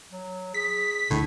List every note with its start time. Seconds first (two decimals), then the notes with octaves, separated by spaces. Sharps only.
0.12 F#3
0.54 G#4 B6
1.10 D2 A2 D3 D4